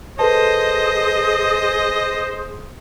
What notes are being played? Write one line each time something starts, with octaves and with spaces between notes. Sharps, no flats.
G#4 A4 B4 C5 D#5 A5